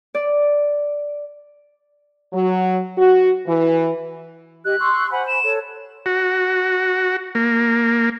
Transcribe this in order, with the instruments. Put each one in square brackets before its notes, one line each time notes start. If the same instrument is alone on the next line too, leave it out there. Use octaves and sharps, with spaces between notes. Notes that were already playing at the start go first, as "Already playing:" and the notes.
[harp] D5
[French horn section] F#3
F#4
E3
[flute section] G4 D#5 [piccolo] F#6
[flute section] C6 C#6 E6
[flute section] C5 G#5 B5 [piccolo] F#5
[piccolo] E7
[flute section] A4 C#5
[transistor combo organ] F#4
A#3